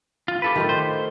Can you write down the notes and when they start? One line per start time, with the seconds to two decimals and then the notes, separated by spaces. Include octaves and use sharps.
0.28 F4
0.42 G4 A4 B4
0.56 D#3 A3 F4
0.69 C5